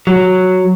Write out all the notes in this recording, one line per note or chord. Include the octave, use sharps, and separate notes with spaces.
F#3